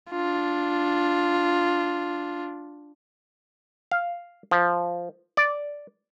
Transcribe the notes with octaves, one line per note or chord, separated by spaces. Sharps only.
D4 F4
F5
F3
D5